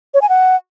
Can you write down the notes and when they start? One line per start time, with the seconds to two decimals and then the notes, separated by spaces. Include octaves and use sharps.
0.14 C#5
0.22 G#5
0.29 F#5